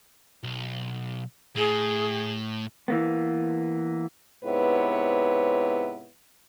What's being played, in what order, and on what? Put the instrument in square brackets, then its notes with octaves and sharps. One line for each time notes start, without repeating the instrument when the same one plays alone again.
[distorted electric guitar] B1
[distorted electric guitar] A2 [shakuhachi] G#4
[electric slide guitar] E3 A#3 B3
[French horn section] G#2 C3 B3 E4 B4 C#5